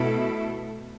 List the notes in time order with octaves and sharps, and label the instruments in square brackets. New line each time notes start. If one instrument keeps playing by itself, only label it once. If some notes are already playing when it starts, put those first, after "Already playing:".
Already playing: [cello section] B2 A3 E4 A4